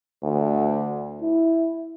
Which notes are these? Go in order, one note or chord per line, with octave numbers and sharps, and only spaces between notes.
D2
E4